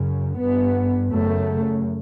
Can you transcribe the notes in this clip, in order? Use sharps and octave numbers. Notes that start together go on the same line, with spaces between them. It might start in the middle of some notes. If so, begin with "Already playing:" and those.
Already playing: F#2 C#3
G2 B3
F#2 C#3 A3